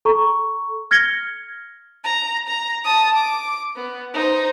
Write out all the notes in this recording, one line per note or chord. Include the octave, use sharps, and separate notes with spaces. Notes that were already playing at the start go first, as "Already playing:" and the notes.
A4 A#5 C#6
F6 G#6 A#6 C#7 G7
A#5
A#5
A5 D#6
D6
B3
D#4 C5